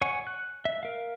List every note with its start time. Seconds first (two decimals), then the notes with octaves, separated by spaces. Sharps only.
0.02 C#5 F#5 G#5 C#6
0.27 F#6
0.65 E5
0.83 A#4 F5